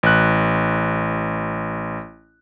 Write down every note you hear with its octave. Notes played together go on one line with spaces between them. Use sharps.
A1 F#6